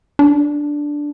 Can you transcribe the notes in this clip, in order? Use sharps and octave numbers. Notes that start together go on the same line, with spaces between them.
D4